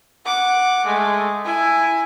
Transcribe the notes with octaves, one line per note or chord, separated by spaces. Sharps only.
F#5 D6
G#3 A3
E4 G#5